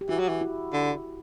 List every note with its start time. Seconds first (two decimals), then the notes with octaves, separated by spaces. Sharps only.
0.01 G4
0.09 E3 F#4
0.19 F#3
0.29 E3
0.41 E4
0.72 D3